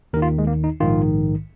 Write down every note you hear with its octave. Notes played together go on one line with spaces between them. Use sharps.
D#2 D#3 A#4
F4
G#3
A#3
D#4
A#1 G#2 D#3 F4